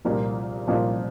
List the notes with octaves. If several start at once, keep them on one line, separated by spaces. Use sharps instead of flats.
C2 A#2 F3 A#3 F4
C2 A#2 F3 A#3 F4